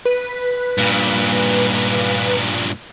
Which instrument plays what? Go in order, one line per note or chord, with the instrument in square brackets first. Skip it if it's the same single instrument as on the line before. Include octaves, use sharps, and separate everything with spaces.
[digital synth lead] B4
[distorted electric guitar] G2 A#2